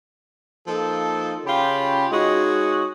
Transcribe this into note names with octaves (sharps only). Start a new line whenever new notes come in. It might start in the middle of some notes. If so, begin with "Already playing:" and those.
F3 A#3 D#4 A4
C#3 C#4 F4 G4 G5 B5
G#3 D#4 F#4 G#4 C#5 D#5